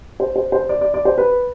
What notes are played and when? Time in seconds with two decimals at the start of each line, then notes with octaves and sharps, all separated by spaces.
0.20 C5
0.36 C5
0.52 C5
0.69 D5
0.81 D5
0.94 D5
1.05 C5
1.18 B4